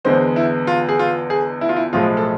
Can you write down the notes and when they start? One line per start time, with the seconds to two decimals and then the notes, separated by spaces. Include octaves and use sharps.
0.04 E2 D3 G#3 B3 C5
0.36 E4
0.67 F4
0.89 G#4
0.99 F4
1.30 G#4
1.61 E4
1.69 F4
1.76 E4
1.93 B1 A2 F3 G#3 F4
2.17 A4